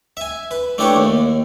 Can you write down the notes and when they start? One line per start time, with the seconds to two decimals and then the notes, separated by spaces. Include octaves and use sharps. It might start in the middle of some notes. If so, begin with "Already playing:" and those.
0.17 E5 G#5
0.51 B4
0.78 A3 D4 E4 G4 B4 C#5
0.96 D#2